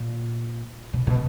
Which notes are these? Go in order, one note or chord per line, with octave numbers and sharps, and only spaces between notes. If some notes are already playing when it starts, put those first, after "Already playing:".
Already playing: A#2
B2
B2